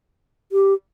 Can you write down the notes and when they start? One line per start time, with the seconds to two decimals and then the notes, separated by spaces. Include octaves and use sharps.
0.52 G4